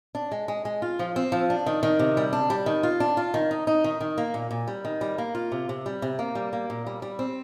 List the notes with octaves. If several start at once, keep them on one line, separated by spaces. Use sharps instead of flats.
D4
G#3
G#3
G#3
F4
F3
C4
F3
D4
D#3
D#3
C3
G3
D4
G3
D#3
F4
D4
F4
D#3
D#4
D#4
D#3
D#3
A#3
A#2
A#2
G3
D#3
G3
A#3
F4
C3
C3
G3
C3
A#3
G3
A#3
A#2
G3
G3
C4